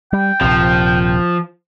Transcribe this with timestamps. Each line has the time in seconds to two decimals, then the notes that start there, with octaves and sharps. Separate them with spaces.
0.13 G3 G5
0.41 D#1 A#1 C3 F3